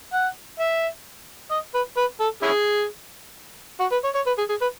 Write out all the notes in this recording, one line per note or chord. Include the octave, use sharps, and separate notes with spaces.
F#5
E5
D#5
B4
B4
A4
C#4 E4 G#4
F#4
B4
C#5
C#5
B4
G#4
G#4
B4